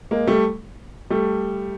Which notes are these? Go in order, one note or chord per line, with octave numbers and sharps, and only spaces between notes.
G#3 A#3
G3 A3
G3 A3